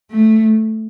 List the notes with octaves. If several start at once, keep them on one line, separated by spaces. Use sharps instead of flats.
A3